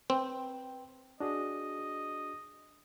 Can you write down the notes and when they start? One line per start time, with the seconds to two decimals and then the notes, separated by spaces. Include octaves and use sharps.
0.10 C4 B4 G5
1.20 D4 F#4 G#4 D#5